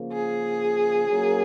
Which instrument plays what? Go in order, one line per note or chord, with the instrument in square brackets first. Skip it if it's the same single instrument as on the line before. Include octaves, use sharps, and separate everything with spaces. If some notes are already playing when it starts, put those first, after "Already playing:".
Already playing: [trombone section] C#3 F3 A#3
[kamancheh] G#4
[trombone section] F#3 A#3 C#4 F#4 A#4